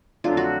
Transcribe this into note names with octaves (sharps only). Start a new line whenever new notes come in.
F2 D3 F#3 A3 D4 F4
F#4